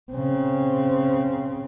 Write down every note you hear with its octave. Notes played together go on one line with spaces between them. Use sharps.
C#3 C4